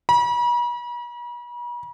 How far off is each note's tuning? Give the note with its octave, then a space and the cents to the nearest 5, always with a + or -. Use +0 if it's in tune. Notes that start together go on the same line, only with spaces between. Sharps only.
B5 -45